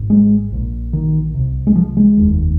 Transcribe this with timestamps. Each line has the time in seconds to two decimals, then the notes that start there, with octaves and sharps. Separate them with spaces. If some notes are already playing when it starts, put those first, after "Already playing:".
Already playing: G#1 G#2
0.10 G#3
0.52 A#1 A#2
0.93 D#3
1.35 C2 C3
1.67 G#3
1.75 F3
1.97 G#3
2.17 F1 D#2